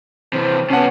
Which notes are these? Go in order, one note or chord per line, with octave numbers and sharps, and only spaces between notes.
C3 E3 C5
C3 B3 C#4 F#5 A5